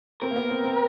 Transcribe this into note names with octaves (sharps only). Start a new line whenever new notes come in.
C4 A#4
A#3
B3
C4
C4